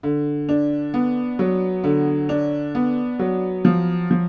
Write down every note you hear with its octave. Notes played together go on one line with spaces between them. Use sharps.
D3
D4
B3
F#3
D3
D4
B3
F#3
F3
F3